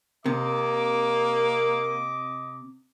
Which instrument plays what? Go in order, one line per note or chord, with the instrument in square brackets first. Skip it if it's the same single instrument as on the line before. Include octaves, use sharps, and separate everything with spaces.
[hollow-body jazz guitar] C3 [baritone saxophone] A#3 [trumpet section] D#5 D6